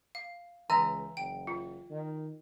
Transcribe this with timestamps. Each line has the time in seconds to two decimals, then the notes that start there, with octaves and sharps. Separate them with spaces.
0.15 F5
0.70 C#2 E3 E5 G#5 A#5 E6
1.17 F#1 G5
1.47 F4
1.91 D#3